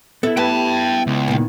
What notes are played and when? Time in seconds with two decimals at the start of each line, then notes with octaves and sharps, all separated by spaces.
0.23 B3 E4 A4 E5
0.37 G4 B4 G5 A5
1.07 C#2
1.28 A#2 D#3